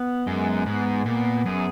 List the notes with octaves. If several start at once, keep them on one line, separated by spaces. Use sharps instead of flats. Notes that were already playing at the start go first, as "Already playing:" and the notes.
Already playing: B3
F#2 G#3
G#2 B3
A#2 B3
F#2 G#4